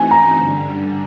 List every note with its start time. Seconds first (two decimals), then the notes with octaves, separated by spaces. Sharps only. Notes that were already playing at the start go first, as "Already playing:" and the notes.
Already playing: E3 A3 C4 D#4 F#4 G#5
0.11 A#5
0.34 G2 D3 G3